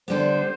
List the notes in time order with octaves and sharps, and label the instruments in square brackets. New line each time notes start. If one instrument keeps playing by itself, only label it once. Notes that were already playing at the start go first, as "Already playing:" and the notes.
[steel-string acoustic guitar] D3 G3 B3 [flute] C5